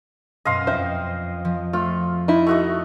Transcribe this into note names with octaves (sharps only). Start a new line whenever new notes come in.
F#2 B2 D#5 F5 C6
F2 C5 E5
F3
A3 F4 F6
D#4 E4
A3 F#4 D#5 C#6